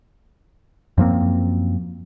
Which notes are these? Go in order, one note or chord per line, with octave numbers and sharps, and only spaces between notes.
F#2 F3 A#3 C4